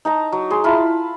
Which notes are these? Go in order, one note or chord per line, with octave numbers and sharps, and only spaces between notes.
D#4 A5 A#5
F#3
G#4 C6
E4 F4 A5 B5